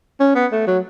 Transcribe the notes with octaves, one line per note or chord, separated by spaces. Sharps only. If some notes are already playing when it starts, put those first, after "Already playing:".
C#4
B3
A3
F#3